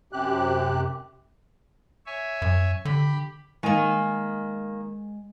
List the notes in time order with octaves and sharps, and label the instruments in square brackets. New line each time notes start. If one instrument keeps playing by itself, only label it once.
[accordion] F#2 C3 G4 F#6
[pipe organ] C#5 E5 G#5
[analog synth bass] F#2
[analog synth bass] D3 [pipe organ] G4 B5
[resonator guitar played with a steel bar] D#3 A#3 [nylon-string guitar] G#3 G#5